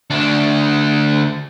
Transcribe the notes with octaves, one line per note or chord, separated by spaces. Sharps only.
D2 D4